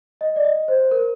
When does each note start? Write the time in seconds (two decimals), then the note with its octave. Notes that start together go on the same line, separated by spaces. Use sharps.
0.21 D#5
0.36 D5
0.44 D#5
0.68 C5
0.91 A#4